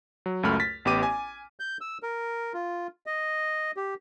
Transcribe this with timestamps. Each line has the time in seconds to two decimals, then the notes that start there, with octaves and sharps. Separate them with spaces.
0.26 F#3
0.43 C#2 F#2 A3 B5 F6
0.60 A6 B6
0.85 A1 B3 G4 D6 D#7
1.03 G#5
1.60 G6
1.81 E6
2.03 A#4
2.54 F4
3.06 D#5
3.77 G4